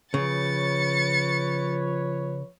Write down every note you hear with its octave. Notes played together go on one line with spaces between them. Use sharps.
C#3 F3 B4 C#5 A6 C#7